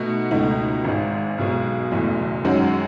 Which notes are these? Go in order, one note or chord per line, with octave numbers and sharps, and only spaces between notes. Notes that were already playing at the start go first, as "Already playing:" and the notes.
Already playing: B2 A3 D#4 F#4
C#2 B2 A3 D#4
G#1 G#2 D#3 G#3
B1 B2 G#3
F#1 E2 B2 A3
F#2 D#3 G#3 C#4 F#4